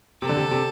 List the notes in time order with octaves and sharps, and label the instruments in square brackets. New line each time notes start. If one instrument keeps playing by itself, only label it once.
[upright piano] C3 [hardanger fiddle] A4
[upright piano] D3
C3
C3